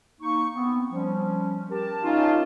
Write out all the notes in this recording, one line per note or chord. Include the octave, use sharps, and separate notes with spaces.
A#3 D#4 C#6
B3 C4
F3 G3 C#4
G4 A#4 A5
C#4 D#4 F4